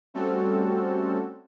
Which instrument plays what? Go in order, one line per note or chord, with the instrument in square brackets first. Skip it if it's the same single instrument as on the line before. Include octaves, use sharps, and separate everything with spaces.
[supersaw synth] G3 A3 C4 C#4 F#4 A4